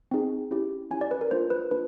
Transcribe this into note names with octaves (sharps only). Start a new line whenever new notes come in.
C4 D#4 G#4
C#4 E4 G4
C#4 E4 G4 G#5
D5
B4
A#4
A#3 D4 F4 C5
B4
A#3 D4 F4 B4